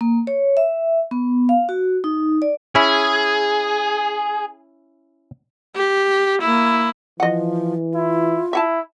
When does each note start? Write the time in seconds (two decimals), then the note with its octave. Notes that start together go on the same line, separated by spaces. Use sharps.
0.01 A#3
0.27 C#5
0.57 E5
1.11 B3
1.49 F5
1.69 F#4
2.04 D#4
2.42 D5
2.75 C#4 E4 G#4
5.76 G4
6.41 A#3 E4
7.20 E3 F3 D#5 F#5
7.94 E4 F4
8.53 E4 E5 F#5 A5